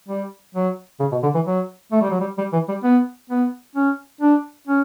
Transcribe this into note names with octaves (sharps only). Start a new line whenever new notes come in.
G3
F#3
C#3
B2
D3
E3
F#3
A3
G3
F#3
G3
G3
E3
G3
B3
B3
C#4
D4
C#4